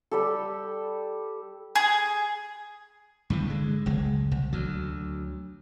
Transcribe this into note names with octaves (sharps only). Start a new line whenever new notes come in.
G3 G4 A4
G#4
G2 C3 E3
D3 G#3
F#1 C#2 G#3
C2
D2 F#3